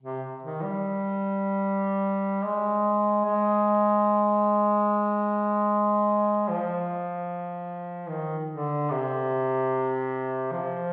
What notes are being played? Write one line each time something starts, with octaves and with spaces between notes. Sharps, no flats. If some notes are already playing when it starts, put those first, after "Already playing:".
C3
D#3
G3
G#3
G#3
F3
D#3
D3
C3
F3